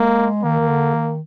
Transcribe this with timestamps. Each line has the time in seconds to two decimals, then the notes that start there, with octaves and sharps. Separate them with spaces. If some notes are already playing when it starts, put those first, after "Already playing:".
Already playing: G#3 A#3
0.43 D#3 A#3
0.60 D#3
0.68 D3
0.94 D#3